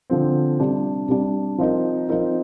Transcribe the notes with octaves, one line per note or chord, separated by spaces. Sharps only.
D3 F3 C4
C3 G3 D4
C3 G3 D4
F3 C4 D#4 A#4
F3 C4 D#4 A#4